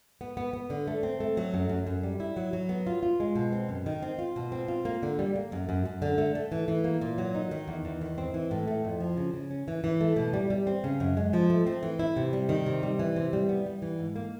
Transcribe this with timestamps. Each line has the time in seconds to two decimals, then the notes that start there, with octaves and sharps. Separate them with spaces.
0.21 B3
0.37 B3
0.53 B3
0.70 D3
0.87 A3
1.03 C4
1.20 A3
1.37 F#3
1.54 F#2
1.69 F#2
1.87 F#2
2.03 G3
2.20 E4
2.37 F#3
2.53 F#3
2.69 B3
2.87 F4
3.03 F4
3.20 G#3
3.35 B2
3.52 C4
3.69 F#2
3.86 D#3
4.02 C4
4.19 F4
4.36 B2
4.52 C4
4.68 F4
4.85 A#3
5.03 D3
5.19 G3
5.35 A#3
5.52 F#2
5.69 F#2
5.85 F#2
6.02 D3
6.18 A3
6.35 A3
6.52 E3
6.68 E3
6.84 A#3
7.01 A#2
7.18 F#3
7.35 D#4
7.51 D#3
7.68 E2
7.85 E2
8.01 D#3
8.18 C4
8.34 E3
8.51 A2
8.67 A3
8.85 F2
9.00 F3
9.17 C#3
9.34 C#3
9.51 C#4
9.68 E3
9.84 E3
10.01 A3
10.16 B2
10.33 G3
10.50 G3
10.67 C4
10.84 C#3
11.00 F#2
11.17 G#3
11.33 F3
11.50 A3
11.66 C4
11.83 E3
11.99 E4
12.16 C3
12.33 G3
12.49 D#3
12.66 C3
12.83 G3
12.99 E3
13.16 C3
13.33 G3
13.49 B3
13.66 G3
13.82 E3
13.99 G#2
14.16 A#3